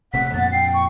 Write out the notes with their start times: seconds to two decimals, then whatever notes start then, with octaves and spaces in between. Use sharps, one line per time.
0.13 D#1 C3 A3 F#5 B6
0.34 F2 A#2 A6
0.52 G5 C7
0.73 C#6